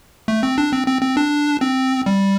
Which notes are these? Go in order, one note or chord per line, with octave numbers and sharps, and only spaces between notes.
A3
C4
D4
C4
C4
C4
D4
C4
G3